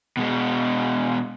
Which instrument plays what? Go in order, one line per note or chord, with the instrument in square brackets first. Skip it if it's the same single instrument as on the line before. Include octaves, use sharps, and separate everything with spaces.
[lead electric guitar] B2 G#3